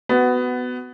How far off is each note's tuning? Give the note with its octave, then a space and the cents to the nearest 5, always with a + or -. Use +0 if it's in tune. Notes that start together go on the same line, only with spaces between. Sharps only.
B3 +15 F#4 +10